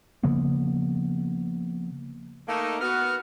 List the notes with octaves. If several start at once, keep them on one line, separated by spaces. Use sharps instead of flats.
C#3 F3 A#3 B3
A3 A#3 D#4
B3 F#4 F6